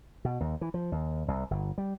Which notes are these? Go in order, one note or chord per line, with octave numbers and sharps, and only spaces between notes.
B2
D#2
E3
F3
D#2
C2
G1
G3